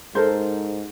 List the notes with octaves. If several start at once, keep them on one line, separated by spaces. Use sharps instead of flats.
G#2 A4 A#4 C5